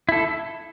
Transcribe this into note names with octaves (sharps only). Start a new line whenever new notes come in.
E4 A4